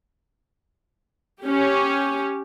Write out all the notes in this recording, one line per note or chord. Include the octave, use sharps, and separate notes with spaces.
C#4 G4